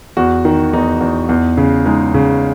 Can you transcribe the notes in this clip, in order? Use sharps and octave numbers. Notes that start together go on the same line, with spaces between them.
E2 F#4
D#3
E2 D#4
E2
E2
C#3
G#3 D#4
C#3